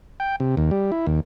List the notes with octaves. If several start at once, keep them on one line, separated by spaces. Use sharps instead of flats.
G5
C3
D#2
G3
E4
D#2